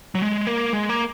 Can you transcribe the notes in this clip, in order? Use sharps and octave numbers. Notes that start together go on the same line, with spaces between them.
F#3
G#3
A#3
G#3
A#3